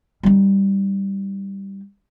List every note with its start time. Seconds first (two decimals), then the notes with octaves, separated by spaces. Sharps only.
0.23 G3 D#4